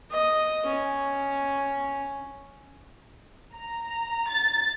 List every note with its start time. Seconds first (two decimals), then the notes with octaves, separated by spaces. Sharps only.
0.10 D#5
0.66 C#4
3.55 A#5
4.29 A6